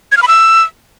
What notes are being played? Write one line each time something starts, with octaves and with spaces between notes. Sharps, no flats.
G#6
F6
B5
E6